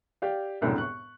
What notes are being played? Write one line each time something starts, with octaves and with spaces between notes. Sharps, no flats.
G4 D5 F5
E1 C2 F#2 A2 D3
C#6 F#6